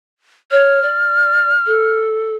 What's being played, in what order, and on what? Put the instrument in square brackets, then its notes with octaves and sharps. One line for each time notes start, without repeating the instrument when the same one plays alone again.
[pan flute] C#5 [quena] F6
[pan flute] D5
A4